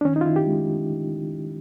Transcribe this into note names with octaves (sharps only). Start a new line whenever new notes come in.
D4
D#3 C#4
D#4
F4
D#3 E4
G4
G#3